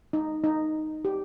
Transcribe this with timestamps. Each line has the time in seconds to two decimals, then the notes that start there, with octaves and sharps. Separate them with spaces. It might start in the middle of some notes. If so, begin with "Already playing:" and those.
0.13 D#4
0.44 D#4
1.05 G4